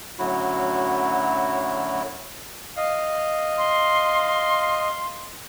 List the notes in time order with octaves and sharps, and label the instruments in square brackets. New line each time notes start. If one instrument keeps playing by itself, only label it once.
[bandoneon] F#2 A2 D3 F#3 E4 F#4
[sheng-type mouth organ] D#5 [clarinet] F5
[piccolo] C6